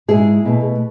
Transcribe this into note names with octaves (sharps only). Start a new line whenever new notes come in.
G#2 G#3 E4 G#4
B2 A3